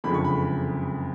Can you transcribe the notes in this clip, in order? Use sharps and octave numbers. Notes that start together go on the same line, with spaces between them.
F#1 F2 D3 G#3 B5
C#6
B5